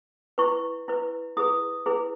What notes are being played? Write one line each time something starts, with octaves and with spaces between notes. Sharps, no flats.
E4 B4 C#6
E4 B4
E4 G#4 B4 D#6
E4 G#4 B4